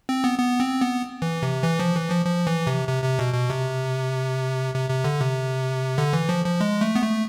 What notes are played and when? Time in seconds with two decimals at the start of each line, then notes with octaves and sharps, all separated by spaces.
0.09 C4
0.24 B3
0.39 B3
0.60 C4
0.81 B3
1.22 E3
1.43 C3
1.64 E3
1.80 F3
1.95 E3
2.10 F3
2.26 F3
2.47 E3
2.67 C3
2.88 C3
3.04 C3
3.19 B2
3.34 B2
3.50 C3
4.74 C3
4.90 C3
5.04 D3
5.20 C3
5.98 D3
6.13 E3
6.29 F3
6.45 F3
6.61 G#3
6.81 A3
6.96 B3
7.02 A3